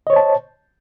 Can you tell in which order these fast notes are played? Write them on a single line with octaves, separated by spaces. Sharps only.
D#5 C#5 C5 A5